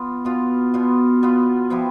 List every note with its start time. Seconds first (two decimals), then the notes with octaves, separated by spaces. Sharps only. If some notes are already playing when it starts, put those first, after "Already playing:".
Already playing: B3 F4
0.25 B2 B3 F4
0.74 B2 B3 F4
1.23 B2 B3 F4
1.70 F3 B3 E4 G4